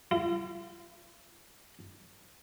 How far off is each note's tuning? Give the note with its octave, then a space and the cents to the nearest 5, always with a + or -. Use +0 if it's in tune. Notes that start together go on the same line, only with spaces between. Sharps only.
F4 -45